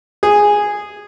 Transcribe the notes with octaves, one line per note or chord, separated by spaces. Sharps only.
G#4